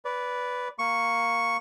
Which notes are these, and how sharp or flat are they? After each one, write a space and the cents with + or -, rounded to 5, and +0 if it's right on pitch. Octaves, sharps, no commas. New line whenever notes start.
B4 +0 D5 -20
A#3 +0 C#6 +0